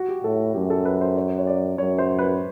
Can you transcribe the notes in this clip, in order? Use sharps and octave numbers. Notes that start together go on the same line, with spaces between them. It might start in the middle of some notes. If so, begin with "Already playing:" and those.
Already playing: F#4
G4
A2 A4
F#2 G4
A4
B4
C5
C#5
C#5
D5
F#2 C#5
C5
B4